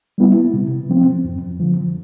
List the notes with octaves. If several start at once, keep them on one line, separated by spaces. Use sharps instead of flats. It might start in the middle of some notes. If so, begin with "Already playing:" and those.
G3 B3 E4
C3
F3 C4
F2
D3 F3